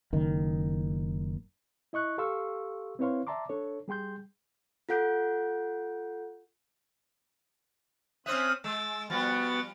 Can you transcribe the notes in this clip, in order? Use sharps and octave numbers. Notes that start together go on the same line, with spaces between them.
F#1 D#3
E4 D#5 C#6 F#6
G4 A4 F5 C6 C#6 E6
C4 E4 B4 C#5 F5 C6
D5 E5 A5 A#5 C6 D6
D4 A4 C#5
G3 G#4 G5 C6 G6
F4 A4 F#5 G6 D7
C4 C#4 C5 E5 D#6 F#6
G#3 E6 A6
F3 G3 B3 F#4 A6